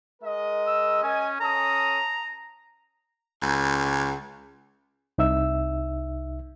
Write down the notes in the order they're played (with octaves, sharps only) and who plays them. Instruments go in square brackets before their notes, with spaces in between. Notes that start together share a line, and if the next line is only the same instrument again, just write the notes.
[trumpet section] G#3 A#4 D#5
[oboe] E6
[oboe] C#4 [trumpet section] D#5 G#5
[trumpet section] C#4 A4 D#6 [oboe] A#5
[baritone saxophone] C#2
[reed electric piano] C2 D#4 E5 E6